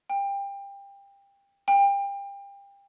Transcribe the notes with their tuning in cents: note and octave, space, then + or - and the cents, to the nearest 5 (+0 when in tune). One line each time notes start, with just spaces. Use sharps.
G5 +25
G5 +30